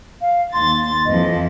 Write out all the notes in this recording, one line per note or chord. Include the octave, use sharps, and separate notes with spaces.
F5
D#2 C6 A6
F2 E3 F3 D#5